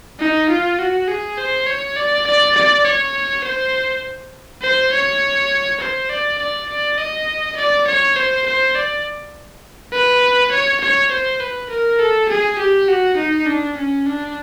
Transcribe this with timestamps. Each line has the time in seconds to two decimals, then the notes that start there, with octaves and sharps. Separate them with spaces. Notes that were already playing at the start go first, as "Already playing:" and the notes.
0.19 D#4
0.49 F4
0.79 F#4
1.08 G#4
1.38 C5
1.67 C#5
1.97 D5
2.26 D5
2.56 D5
2.85 C#5
3.44 C5
4.62 C5
4.92 C#5
5.80 C5
6.09 D5
6.38 D5
6.69 D5
6.97 D#5
7.57 D5
7.87 C#5
8.16 C5
8.46 C5
8.75 D5
9.93 B4
10.51 C#5
10.81 C#5
11.11 C5
11.40 B4
11.70 A#4
11.99 A4
12.29 G#4
12.59 G4
12.88 F#4
13.17 D#4
13.46 D4
13.77 C#4
14.06 D4